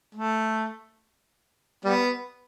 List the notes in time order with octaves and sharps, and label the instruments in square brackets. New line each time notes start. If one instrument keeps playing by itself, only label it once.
[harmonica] A3
G3 B3